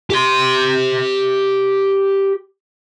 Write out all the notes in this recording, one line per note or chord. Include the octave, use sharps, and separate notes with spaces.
G4 C6